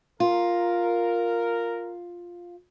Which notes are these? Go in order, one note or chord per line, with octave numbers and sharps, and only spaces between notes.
F4 A#4